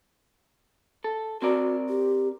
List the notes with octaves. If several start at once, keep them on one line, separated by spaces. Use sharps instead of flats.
A4
C4 F#4 A#4 D5
G4